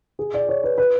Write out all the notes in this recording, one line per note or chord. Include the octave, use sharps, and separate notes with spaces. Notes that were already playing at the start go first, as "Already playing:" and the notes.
G#4
D5
C#5
B4
B4